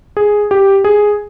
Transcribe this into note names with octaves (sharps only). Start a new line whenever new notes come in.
G#4
G4
G#4